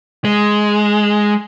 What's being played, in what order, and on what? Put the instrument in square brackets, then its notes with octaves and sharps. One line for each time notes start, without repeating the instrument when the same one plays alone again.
[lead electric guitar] G#3